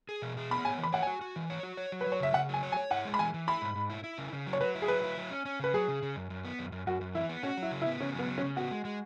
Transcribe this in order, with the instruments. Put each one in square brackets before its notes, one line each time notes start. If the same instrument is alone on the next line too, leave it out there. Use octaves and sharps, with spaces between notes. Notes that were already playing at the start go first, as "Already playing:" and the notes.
[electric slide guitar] G#4
B2
G#4
[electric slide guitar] B3 [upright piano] B5
[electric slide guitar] C#5 [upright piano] G#5
[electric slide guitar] E3
[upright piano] B5
[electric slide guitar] C#5 [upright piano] F#5
[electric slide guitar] F#4 [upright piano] G#5
[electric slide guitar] F#4
E3
C#5
F#4
C#5
F#3
[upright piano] B4
[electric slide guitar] F#3
[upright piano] C#5
[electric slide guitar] C#3 [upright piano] E5
[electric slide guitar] C#3 [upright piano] F#5
[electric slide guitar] F#3 [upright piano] G#5
[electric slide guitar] C#5
[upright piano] G#5
[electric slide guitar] C#5
[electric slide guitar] E4 [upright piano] F#5
[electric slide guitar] G#3
[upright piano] B5
[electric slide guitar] E3 [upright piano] G#5
[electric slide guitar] E3
[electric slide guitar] E4 [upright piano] B5
[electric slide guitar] G#2
G#2
E4
E4
C#3
C#3
F#3
[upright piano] C#5
[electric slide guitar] F#3 [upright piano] B4
[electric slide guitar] E4
[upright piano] G#4
[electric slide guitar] F#3 [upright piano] B4
[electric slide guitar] E4
F#3
C#4
C#4
[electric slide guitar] C#3 [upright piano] B4
[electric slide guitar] F#3 [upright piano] G#4
[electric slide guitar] C#3
C#3
F#2
F#2
B3
F#2
F#2
[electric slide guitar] F#2 [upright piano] F#4
[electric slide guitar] F#2
[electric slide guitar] E3 [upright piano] E4
[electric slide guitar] B3
[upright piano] C#4 [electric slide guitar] F#4
[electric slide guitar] F#3 [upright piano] E4
[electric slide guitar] C#3
[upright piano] E4
[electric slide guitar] B3
[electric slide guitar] C#3 [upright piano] C#4
[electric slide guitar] F#3 [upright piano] B3
[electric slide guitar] C#3
[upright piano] C#4
[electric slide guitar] C#3
[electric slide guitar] B3 [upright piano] F#4
[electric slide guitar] G#3
G#3